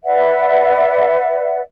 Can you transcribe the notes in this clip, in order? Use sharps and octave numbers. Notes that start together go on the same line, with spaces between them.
B4 D5 E5 F#5